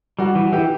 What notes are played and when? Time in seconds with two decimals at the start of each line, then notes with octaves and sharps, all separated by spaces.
0.19 G3 F#4
0.35 E3
0.52 E3 G4